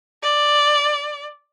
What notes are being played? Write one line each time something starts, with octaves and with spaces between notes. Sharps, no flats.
D5